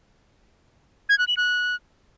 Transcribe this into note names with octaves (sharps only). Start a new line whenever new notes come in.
G#6
F#6
F#7
F#6